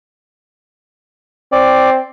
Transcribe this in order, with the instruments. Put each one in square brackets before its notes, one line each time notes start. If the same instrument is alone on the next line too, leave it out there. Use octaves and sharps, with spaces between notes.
[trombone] C4 [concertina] D5